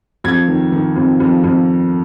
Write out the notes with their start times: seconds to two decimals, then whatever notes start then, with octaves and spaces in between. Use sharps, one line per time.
0.24 F2 G#6
0.48 D#3
0.72 D#3
0.96 F2
1.20 F2
1.44 F2